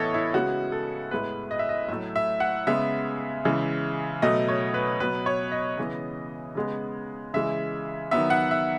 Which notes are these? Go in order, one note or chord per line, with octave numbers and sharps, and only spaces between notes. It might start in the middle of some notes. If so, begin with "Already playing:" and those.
Already playing: A2 E3 B3 A4 C#5 D#5
E4
C#3 G#3 B3 F#4
A4
A2 G#3 B3 B4
D#5
E5
D#5
A2 F#3 A3 E5
E5
F#5
C#3 G#3 B3 E5
C#3 E3 G#3
B2 F#3 A3 D#5
C#5
B4
B2 F#3 B3 B4
C#5
D#5
C#3 E3 G#3 B3
C#3 G#3 B3
C#3 E3 G#3 E5
D#3 F#3 B3 E5
F#5
E5